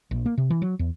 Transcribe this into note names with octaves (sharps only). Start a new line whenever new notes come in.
A#1
A#3
C3
E3
F#3
E2